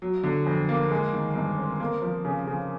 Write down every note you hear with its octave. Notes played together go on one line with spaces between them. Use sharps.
F#3
D3
F2
A#3
G#3
D#3
G2
C4
A#3
F3
C#3
C#3